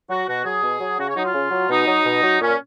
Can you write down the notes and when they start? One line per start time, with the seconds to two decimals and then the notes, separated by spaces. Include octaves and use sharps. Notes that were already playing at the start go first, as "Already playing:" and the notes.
0.09 F#3 F#4
0.28 B2 F#4
0.45 F#3 G#4
0.63 B2
0.80 F#3
0.98 C#3 F#4
1.07 C#5
1.16 F#3 D#4
1.25 F4
1.34 C#3
1.51 F#3
1.69 B2 D#4
1.87 F#3
2.05 B2
2.23 F#3
2.40 A#2 C#4